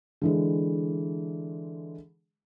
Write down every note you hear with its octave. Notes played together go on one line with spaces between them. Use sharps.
D3 E3 G#3